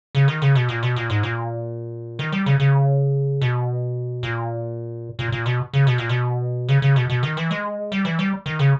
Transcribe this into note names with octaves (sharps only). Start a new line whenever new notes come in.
C#3
D#3
C#3
B2
A#2
B2
A#2
G#2
A#2
D#3
G3
C#3
C#3
B2
A#2
A#2
A#2
B2
C#3
B2
A#2
B2
C#3
C#3
B2
B2
D#3
E3
G#3
G3
E3
G3
D#3
C#3